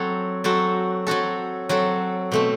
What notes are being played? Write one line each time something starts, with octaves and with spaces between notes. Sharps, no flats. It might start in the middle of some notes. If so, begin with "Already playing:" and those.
Already playing: F#3 C4 F#4 A4
F#3 C4 F#4 A4
F#3 C4 F#4 A4
F#3 C4 F#4 A4
B2 A3 C4